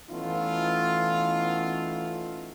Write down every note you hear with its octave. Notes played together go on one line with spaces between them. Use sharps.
E3 A3 B3 C#4 D#4 F4